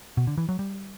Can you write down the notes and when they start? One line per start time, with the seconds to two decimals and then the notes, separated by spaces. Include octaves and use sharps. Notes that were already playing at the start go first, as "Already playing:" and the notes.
0.17 B2
0.27 D3
0.38 E3
0.49 F#3
0.59 G3